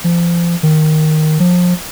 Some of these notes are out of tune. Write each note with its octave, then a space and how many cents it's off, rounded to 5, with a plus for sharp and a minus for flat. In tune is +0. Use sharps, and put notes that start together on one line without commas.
F3 -30
D#3 +0
F3 +30